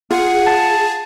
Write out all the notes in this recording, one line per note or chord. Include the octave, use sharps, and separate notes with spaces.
F4 G#4 F#5
A5